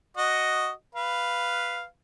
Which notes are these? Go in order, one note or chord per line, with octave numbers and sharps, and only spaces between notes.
F#4 D#5
B4 F5